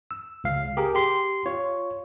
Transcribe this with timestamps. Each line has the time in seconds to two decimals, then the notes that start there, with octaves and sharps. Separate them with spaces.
0.11 E6
0.44 C#2 F5
0.77 G4 G#4 A#4
0.95 G4 C6
1.46 F4 C#5